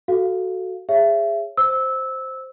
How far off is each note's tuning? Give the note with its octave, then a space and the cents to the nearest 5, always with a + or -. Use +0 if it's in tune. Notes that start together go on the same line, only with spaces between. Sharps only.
F#4 +5 A4 +0 F5 +0
G#4 -20 C#5 +0 E5 +25
C5 +0 E6 -15